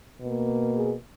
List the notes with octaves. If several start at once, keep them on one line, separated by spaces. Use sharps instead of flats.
B2 A#3
G#4